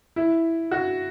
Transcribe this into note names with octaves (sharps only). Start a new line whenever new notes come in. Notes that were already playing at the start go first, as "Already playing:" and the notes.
E4
F#4